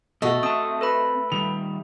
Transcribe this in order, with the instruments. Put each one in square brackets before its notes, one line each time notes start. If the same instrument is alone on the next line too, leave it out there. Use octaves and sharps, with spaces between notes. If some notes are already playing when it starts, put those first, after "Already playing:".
[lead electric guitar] B2 [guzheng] A3 [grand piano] F#4 D#5
[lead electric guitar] C4 A5 [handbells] D#6
[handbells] A4 B4 B5
[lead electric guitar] D#3 G3 [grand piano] F7